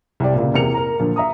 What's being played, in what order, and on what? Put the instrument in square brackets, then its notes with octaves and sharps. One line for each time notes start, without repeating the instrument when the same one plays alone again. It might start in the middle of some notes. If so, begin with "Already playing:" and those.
[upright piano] C2 G4 D5
C#2 A#2
E2 C3 A#3 C#7 F7
A#4 A#5
A#2 D3 F3
E5 A#5 D#6